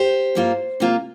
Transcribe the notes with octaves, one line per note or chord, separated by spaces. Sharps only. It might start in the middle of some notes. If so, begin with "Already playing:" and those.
Already playing: G4 C5
G2 G3 A#3 F4
C3 A#3 F4